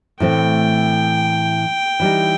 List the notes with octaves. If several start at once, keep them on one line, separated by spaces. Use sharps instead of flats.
A2 E3 A3 C4 G5
E3 G3 D#4